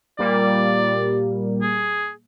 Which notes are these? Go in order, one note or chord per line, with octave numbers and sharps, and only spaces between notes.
A#2 G3 A#3 D5
G#4